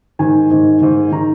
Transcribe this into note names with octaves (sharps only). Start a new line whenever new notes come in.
G#2 D#3 G#5
G#2 D#3
G#2 D#3
D#3 A#5